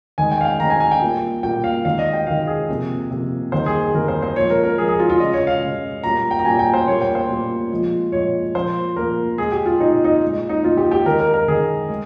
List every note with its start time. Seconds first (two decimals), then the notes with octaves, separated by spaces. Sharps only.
0.18 D#3 G#3 G#5
0.31 G5
0.41 F5
0.45 G5
0.60 D#3 G#3 A#5
0.70 G#5
0.80 G#5
0.91 G5
1.01 A#2 G3 A#3
1.43 A#2 G3 A#3 G5
1.64 F5
1.85 D#3 G#3 F5
1.99 D#5
2.13 G5
2.27 D#3 G#3 F5
2.47 G#4
2.69 C3 F3 A#3
3.11 C3 F3 A#3
3.52 D#3 G3 A#3 C5
3.66 G#4
3.80 G#4
3.94 D#3 G3 A#3 A#4
4.08 C5
4.22 C5
4.36 A#2 F3 G#3 C#5
4.50 A#4
4.64 A#4
4.78 A#2 F3 G#3 G#4
4.88 G#4
4.99 F4
5.10 F4
5.20 C#3 G#3 D#5
5.33 C#5
5.47 F5
5.62 C#3 G#3
6.04 A#2 G3 A#3 A#5
6.31 G5
6.39 A#5
6.45 A#2 G3 A#3 G#5
6.59 G5
6.74 C5
6.88 A#2 G3 A#3 C#5
7.01 G5
7.15 C5
7.30 A#2 G3 A#3
7.71 A#2 F3 G#3
8.12 A#2 F3 G#3 C#5
8.54 A#2 F3 A#3 C5
8.96 A#2 F3 A#3 A#4
9.38 A#2 G#3 G#4
9.52 G4
9.66 F4
9.80 A#2 G#3 D#4
10.04 D#4
10.22 A#2 G#3
10.49 D#4
10.64 A#2 G#3 F4
10.77 G4
10.91 G4
11.06 D#3 G#3 A#4
11.20 A#4
11.34 A#4
11.48 D#3 G#3 G#4
11.89 G#3